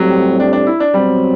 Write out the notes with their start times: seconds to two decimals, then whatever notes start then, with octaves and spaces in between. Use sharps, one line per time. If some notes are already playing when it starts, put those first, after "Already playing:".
Already playing: A2 F#3 G3 C4 G4
0.40 D4
0.53 D4
0.67 E4
0.80 D4
0.94 B2 F#3 G3 C4